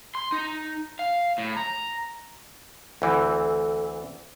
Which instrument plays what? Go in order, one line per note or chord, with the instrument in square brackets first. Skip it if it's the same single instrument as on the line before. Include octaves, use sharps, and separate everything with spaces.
[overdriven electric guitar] C6
D#4
F5
A2
A#5
[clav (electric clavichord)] D2 E3 C4 [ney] A4